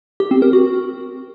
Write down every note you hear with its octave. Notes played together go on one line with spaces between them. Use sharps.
G4
C4
A#4
F#4